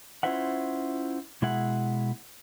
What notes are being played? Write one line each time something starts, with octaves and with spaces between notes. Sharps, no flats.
C#4 E4 F4 C5 E5 F#5
B2 G#3 E4 G#4 E5 F#5